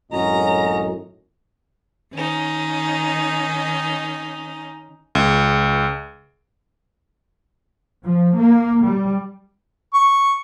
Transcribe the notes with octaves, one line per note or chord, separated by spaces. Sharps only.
G#1 F#2 A2 C#4 F#4 D#5 A#5
D#3 C#4 D#4
C#2
F3
A#3
G3
C#6